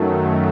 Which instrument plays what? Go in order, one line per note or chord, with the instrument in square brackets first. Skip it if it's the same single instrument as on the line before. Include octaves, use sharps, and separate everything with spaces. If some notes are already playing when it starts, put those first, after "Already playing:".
Already playing: [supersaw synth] F#2 D#3 F#3 A3